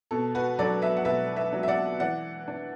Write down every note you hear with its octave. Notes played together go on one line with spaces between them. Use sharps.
B2 A4
F#4 B4
F#3 D4 A4 D5
B4 E5
F#5
B2 B4 E5
B4 E5
F#3 D4
E5
D5 F#5
E3 D5 F#5
D4